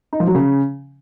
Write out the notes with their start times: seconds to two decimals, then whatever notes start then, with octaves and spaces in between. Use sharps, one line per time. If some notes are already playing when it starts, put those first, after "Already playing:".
0.13 D#4
0.20 F3
0.27 F#3
0.35 C#3